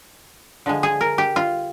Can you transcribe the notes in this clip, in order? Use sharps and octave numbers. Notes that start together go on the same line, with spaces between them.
D3 F3 G#3
G#4
A#4
G4
F4